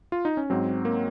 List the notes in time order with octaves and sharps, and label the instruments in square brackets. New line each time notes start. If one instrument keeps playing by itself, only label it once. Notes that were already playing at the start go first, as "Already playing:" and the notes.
[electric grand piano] F4
D#4
C#4
G#2 F#3 C4
A#3